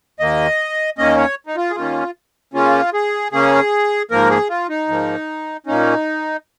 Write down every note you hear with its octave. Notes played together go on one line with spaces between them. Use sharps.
D#2 D#3 A#3 D#5
D#2 D#3 A#3 C#4 D#5
C#5
D#4
F4
G#4
D#2 D#3 A#3 C#4 F4
C#3 A#3 C#4 F4
G#4
C#3 A#3 C#4 G#4
G#2 F3 A#3 A#4
G#4
F4
D#4
G#2 F3 A#3
A#2 A#3 C#4 D#4